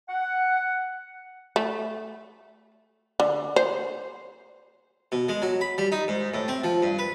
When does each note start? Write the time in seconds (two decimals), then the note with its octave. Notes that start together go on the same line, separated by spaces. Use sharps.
0.09 F#5
1.56 A3
3.20 D3
3.56 C5
5.12 B2
5.29 G#3
5.42 F#3
5.61 B5
5.78 G3
5.92 D#4
6.08 G#2
6.34 A2
6.48 C4
6.64 F3
6.82 G2
6.99 B4